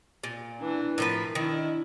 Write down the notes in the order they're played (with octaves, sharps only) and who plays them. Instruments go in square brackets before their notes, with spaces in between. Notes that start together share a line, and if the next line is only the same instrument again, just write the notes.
[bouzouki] A#2
[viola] E3 D4
[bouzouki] A2 F3 B4 [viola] A#4
[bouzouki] D#3 [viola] D4 E4